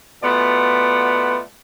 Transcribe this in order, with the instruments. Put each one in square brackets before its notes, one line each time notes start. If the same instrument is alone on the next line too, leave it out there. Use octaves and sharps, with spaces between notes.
[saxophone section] B2 A3 B3 F4 D5 F#5